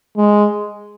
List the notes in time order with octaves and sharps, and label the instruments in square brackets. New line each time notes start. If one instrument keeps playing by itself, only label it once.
[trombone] G#3